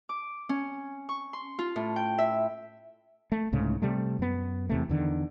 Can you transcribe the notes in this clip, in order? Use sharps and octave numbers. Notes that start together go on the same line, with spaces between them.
D6
C#4
C#6
C6
F4
A2
G5
E5
A3
C2 G#2 C#3 A3
C3 G3 A3
F#2 B3
E2 C3 A3
E2 D3 D#3